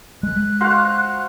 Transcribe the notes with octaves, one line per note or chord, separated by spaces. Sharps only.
G#3 F#6
F#4 C5 F5